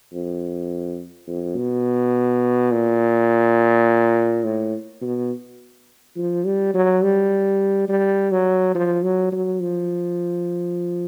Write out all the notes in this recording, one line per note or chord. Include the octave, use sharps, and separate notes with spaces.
F2
F2
B2
A#2
A2
B2
F3
G3
F#3
G3
G3
F#3
F3
F#3
F#3
F3